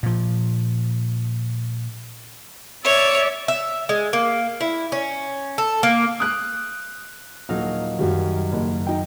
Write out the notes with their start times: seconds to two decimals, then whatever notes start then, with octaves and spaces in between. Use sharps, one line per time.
0.03 A#2 F3
2.85 C#5 D5 E5
3.48 E5
3.89 G#3
4.13 A#3
4.61 E4
4.92 C#4
5.58 A4
5.83 A#3
6.20 D#6 F6 F#6
7.49 D#1 F#3 D#4 F5
7.98 F#2 D#3 F#3 G3
8.52 F#1
8.87 D#4 G5